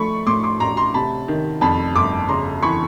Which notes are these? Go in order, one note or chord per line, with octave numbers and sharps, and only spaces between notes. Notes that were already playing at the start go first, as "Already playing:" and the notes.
Already playing: F3 A3 B5 C#6
A2 C6 D6
C6 D6
A1 A#5 C6
A#5 C6
C3 A5 B5
D#3
F2 A5 B5
G1 C6 D6
C#3 A#5 C6
E3 B5 C#6